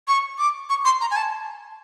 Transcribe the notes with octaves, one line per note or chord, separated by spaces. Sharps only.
C#6
D6
C#6
C6
A#5
G#5
A5